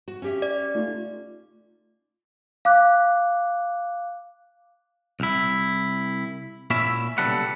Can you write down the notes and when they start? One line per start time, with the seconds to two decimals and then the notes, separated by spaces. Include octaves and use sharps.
0.08 F#4
0.22 C#4 G4 E5
0.42 D5
0.75 A3 D#4 F4
2.65 F5 D6 F#6
5.20 C2 E4
6.70 A#2 C#4 E4 E5
7.18 B1 C#3 G3 A4 B4 F#5